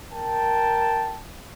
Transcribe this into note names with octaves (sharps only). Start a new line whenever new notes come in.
A#4 G5 A5